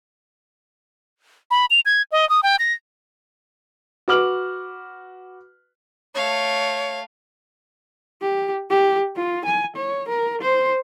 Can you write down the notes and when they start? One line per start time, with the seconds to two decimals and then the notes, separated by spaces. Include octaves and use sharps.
1.51 B5
1.70 F7
1.86 G#6
2.12 D#5
2.30 D#6
2.43 G5
2.59 A#6
4.08 F#4 B4 D6 F6 F#7
6.15 A3 C#5 F5
8.22 G4
8.70 G4
9.16 F4
9.45 G#5
9.76 C#5
10.09 A#4
10.41 C5